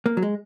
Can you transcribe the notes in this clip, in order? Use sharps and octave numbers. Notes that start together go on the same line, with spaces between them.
A#3
F#3
G#3